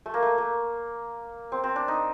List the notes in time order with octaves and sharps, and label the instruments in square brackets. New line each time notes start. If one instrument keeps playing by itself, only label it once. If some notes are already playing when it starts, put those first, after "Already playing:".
[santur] A3
A#3
A3
A#3
C4
C4
D4
D#4